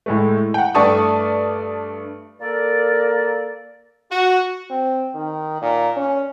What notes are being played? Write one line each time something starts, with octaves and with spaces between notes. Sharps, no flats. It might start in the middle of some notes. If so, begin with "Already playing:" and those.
A2 G#3 A3
F#5 G5
G2 A3 D5 A5 C#6 D#6
A#3 A4 A#4 D5
F#4
C4
D#3
A#2
C#4